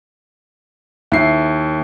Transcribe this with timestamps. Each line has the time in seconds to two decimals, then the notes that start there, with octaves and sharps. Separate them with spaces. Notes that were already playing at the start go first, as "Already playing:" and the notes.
1.12 D#2 E4 C7